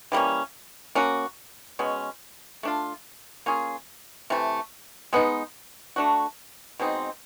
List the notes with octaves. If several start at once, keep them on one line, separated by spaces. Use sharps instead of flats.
E3 G3 A#3 C#4
A#3 C#4 F#4
B2 G#3 C#4
A3 D4 F4
A#3 C#4 F4 G#4
C3 E3 A3
G#3 B3 D#4
A3 D4 F#4
B2 G#3 C4 D#4